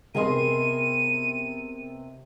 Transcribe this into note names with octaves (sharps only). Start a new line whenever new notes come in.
C3 B3 G#4 A#4 D#5 C6 D#7